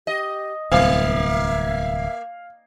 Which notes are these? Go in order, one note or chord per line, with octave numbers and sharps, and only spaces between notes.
G4 D#5
D1 C2 A#3 E5 F5